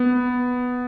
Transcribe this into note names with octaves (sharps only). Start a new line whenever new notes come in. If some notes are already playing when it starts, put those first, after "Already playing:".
Already playing: B3